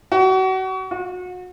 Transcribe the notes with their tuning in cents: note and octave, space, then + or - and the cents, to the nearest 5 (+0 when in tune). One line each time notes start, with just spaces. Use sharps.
F#4 +30
F#4 -35